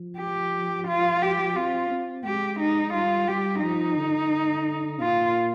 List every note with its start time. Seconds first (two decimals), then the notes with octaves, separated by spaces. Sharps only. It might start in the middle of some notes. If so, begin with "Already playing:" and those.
Already playing: F3
0.18 G4
0.88 F4
1.22 G4
1.56 C4 F4
1.90 C4
2.24 G#3 G4
2.60 D#4
2.94 G3 F4
3.28 G3 G4
3.63 F3 D#4
3.98 D3
5.01 A#2 F4